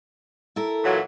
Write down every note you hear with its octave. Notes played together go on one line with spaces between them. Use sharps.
E4 A4 A#4
A#2 E3 F#3